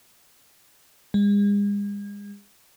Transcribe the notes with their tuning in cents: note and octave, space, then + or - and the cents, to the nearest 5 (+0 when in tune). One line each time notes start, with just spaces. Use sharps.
G#3 -40